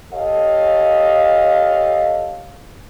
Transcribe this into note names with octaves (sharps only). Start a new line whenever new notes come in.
G4 A4 C#5 D#5 F5